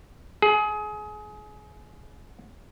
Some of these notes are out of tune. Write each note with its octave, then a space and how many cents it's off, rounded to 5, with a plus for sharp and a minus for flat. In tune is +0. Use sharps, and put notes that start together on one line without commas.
G#4 +25